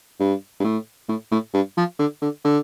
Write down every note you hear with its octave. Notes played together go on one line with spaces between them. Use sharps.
G2
G2
A2
A2
A2
G2
F3
D3
D3
D3